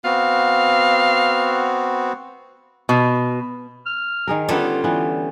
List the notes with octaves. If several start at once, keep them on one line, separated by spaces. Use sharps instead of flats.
B3 C4 F#4 F5
B2
F6
D#3 G#4 A#4
D3 G3 B3 C#4 F4 A4 D5
E3 B3